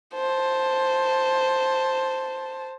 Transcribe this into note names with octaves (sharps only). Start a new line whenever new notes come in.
C5 A5